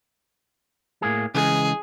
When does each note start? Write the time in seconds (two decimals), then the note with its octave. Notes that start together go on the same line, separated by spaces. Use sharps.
1.02 A2 A#3 G#4
1.34 C#3 E3 G#3 G#4